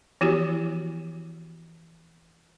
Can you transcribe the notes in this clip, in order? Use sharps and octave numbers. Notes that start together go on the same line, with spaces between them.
E3 F3 B3 E4 F#4 G4